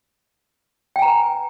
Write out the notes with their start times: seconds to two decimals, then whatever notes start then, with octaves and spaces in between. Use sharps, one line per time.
0.96 G5
0.99 G#5
1.02 A#5
1.05 B4